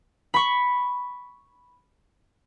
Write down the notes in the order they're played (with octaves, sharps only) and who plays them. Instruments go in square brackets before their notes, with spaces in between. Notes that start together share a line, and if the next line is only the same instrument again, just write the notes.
[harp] B5 C#6